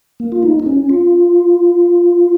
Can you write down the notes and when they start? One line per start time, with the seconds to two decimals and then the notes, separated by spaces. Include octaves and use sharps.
0.20 A#3
0.32 F4
0.43 D#4
0.60 D#4
0.66 C#4
0.89 F4